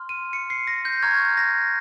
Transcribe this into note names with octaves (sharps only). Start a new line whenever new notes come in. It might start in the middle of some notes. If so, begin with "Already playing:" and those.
Already playing: C6 F6
D#7
C#7
C7
A#6
G6
A#5 C#6 F6 G#6
A#6